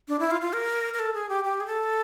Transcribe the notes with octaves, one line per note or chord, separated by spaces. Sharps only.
D4
E4
F4
F4
A#4
A#4
A4
G#4
G4
G4
G#4
A4